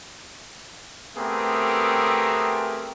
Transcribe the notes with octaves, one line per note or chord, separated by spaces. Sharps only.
A3 B3 C4 G4 G#4 A#4